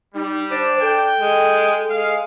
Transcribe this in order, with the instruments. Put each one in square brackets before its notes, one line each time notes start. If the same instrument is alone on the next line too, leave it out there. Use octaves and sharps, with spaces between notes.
[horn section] G3 [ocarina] D#4
[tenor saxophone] D4 [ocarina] C5
[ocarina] A4 [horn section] G5
[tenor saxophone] G#3
[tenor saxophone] G#3 [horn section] F5